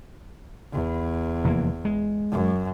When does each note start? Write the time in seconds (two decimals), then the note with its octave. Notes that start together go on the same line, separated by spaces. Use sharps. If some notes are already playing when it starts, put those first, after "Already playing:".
0.72 E2
1.44 F1 E3 A#3
1.85 G#3
2.32 F#2